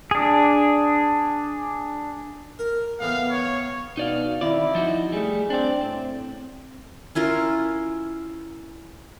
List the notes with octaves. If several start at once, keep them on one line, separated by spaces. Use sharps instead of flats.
D4 G#4
A#4
A2 E3 B3 F5
C#5
B2 D#4 D5 F5
D#3 C4 E4 D5
F3 D#4 F#4
G3 A3 G#4
C4 D4 D5
A2 C4
C#4 E4 F4 A#4